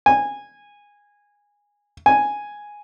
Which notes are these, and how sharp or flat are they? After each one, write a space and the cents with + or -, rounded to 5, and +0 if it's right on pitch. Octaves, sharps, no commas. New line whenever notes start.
G#5 -15
G#5 +0